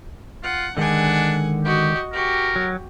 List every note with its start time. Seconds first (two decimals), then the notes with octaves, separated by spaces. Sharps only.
0.44 F4 F#5
0.77 D3 D#3 G#3 D4 F#5 G#5
1.65 F#4 G4 D#5
2.13 F#4 G4 A#4
2.56 F#3